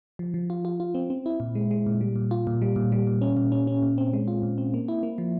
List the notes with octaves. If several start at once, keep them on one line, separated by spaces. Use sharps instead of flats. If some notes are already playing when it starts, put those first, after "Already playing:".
F3
F3
F4
F4
F4
C4
C4
E4
A#2
G#3
G#3
A#2
G3
A#2
F4
A#2
G3
A#2
G3
A#2
C#4
A#2
C#4
C#4
A#2
C4
G#3
F4
A#2
C4
A#3
E4
A#3
F3